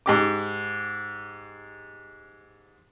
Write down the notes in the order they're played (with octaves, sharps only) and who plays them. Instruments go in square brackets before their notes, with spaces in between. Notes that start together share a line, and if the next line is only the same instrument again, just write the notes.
[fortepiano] G#2 G4 D6